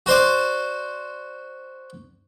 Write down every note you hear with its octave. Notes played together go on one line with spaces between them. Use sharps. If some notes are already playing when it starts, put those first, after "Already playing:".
F#4 C5 D5